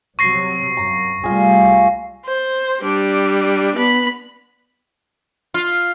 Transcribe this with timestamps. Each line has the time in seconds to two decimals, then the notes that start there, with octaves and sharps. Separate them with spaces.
0.19 C2 C3 F#3 C#6 A#6 C7
0.77 F#2 A#5
1.24 C2 G3 A3 F4 G#4
2.26 C5
2.81 G3 D4
3.75 B3 B5
5.54 F4